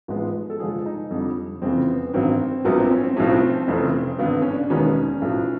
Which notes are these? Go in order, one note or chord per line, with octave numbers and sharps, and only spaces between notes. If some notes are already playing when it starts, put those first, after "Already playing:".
A1 G#2 F3 G#3 B3
A4
G2 D3 F3 G#3 G#4
D#4
F2 D3 G3
F2 C#3 E3 C4
B3
A1 G2 D#3 F#3 C4
A#1 A#2 F#3 B3
C4
C#4
C4
B1 A2 F3 A3 C#4
C4
F1 F2 C#3 E3 A3
G#1 G2 D3 B3
C#4
D4
E1 D#2 D#3 G#3 B3 C#4
B1 A2 F3